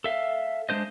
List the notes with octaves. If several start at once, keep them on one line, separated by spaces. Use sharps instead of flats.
A4 E5 F5
G#3 D4 C5 D#5